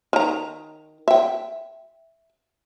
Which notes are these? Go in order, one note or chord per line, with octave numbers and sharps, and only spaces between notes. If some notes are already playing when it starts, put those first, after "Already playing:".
D#3 A#5
E5 G5